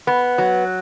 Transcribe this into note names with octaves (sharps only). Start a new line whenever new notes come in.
B3
F#3